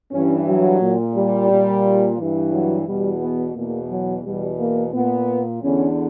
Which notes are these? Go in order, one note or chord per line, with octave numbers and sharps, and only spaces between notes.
G2 E3 C#4
F#3
A#2
G3
A#2
G2 E3
F#3
E2 B2 G3
B3
E2 B2 A#3
F#3
E2 B2 G3
A#3
A#2 B3
E2 D3 C#4